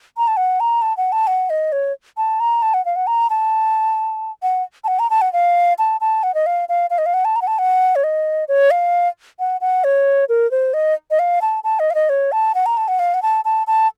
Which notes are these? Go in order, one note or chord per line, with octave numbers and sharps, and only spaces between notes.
A#5
A5
F#5
A#5
A5
F#5
A5
F#5
D#5
C#5
A5
A#5
A5
F#5
F5
F#5
A#5
A5
F#5
A5
F#5
A#5
A5
F#5
F5
A5
A5
F#5
D#5
F5
F5
F5
D#5
F5
F#5
A5
A#5
F#5
A5
F#5
C#5
D#5
C#5
F5
F#5
F#5
C#5
A#4
C5
D#5
D#5
F5
A5
A5
D#5
F5
D#5
C#5
A5
F#5
A#5
A5
F#5
F5
F#5
A5
A5
A5